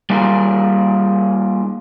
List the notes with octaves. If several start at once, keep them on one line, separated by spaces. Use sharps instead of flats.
G3 A#3 D#4 F4 G#4 A#4